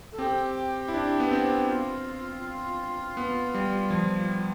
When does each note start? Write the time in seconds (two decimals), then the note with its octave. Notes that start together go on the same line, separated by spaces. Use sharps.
0.12 A4
0.18 C4 G4
0.88 E4
0.94 D4
1.20 B3
1.31 C4
1.68 F4
3.17 B3
3.54 G3
3.90 F3